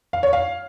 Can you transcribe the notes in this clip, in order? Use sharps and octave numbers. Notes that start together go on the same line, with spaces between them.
F5
C#5
F5